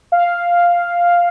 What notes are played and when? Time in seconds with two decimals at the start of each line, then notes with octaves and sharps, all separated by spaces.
0.12 F5